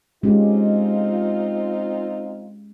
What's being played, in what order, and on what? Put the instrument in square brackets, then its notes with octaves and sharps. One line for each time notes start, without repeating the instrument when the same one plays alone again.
[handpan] G#3 C#4 G4 [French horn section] C4 D#4 F4